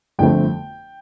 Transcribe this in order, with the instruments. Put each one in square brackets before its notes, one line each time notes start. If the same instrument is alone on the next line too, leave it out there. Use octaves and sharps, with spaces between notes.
[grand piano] G1 F2 D3 A3 C4 G5